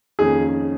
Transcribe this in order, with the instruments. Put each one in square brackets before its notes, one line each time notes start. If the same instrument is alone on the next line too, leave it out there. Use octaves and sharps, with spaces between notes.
[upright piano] F2 D#3 A#3 C#4 [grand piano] G#4